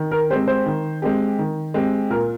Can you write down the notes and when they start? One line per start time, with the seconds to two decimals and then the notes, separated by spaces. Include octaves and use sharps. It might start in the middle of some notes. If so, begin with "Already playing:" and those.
Already playing: D#3
0.11 A#4
0.30 G#3 C4 G4 C5
0.48 C5
0.66 D#3
1.02 G#3 C4 G4
1.38 D#3
1.74 G#3 C4 G4
2.10 A#2 A#4